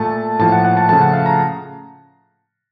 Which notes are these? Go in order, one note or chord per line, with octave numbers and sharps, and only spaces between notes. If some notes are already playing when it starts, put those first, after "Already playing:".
Already playing: A#2 A3 A5
A2 F3 A#3 A5
F#5
F#5
A5
C#3 F3 A3 A5
F#5
F5
A#5